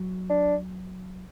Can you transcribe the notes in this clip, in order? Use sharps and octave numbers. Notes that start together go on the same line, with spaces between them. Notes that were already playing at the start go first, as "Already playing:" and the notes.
Already playing: F#3
D4